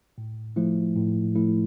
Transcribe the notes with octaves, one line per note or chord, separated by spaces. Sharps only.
A2
F3 A3 E4
A2
F3 A3 E4